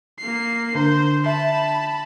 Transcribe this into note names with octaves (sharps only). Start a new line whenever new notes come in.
A#3 C7
D3 D4 C5
E5 A5 B5